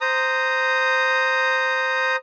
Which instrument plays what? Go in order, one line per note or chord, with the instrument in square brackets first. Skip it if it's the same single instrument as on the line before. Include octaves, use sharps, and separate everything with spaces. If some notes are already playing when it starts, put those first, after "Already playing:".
[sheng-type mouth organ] C5 A#5 D#6